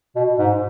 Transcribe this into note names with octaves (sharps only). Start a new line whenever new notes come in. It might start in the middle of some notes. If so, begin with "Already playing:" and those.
B2
G#2